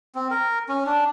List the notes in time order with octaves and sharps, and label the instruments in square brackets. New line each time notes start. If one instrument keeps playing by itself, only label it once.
[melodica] C4
A#4
C#4
D4